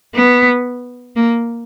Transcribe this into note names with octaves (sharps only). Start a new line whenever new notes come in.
B3
A#3